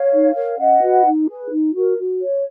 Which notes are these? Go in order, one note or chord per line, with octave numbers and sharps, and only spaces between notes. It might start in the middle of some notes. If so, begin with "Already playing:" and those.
Already playing: C#5 F5
D#4
A#4 C#5
C#4 D#5 F#5
F#4 B4
D#4
G#4 B4
D#4
F#4 A#4
F#4
C#5